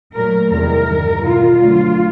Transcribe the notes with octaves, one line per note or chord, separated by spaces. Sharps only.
A#2 F#3 A3 A#4
E2 C3 D#3 G3 A#4
G2 D#3 G3
B2 G3 F4
D2 D3 F#3 A3